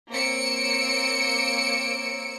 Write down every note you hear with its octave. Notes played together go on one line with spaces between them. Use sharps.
A#3 C4 C#5 E6 C#7 D7